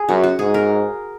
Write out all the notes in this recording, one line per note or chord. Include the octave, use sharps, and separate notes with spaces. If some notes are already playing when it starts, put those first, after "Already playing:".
Already playing: G#4
F#2 F#4
F#4
G#2 G#4
A#4